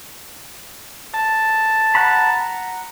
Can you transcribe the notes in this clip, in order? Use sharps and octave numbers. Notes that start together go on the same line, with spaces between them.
A5
F#5 A#5 B5